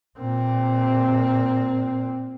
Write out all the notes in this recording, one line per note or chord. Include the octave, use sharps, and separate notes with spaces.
A#2 C4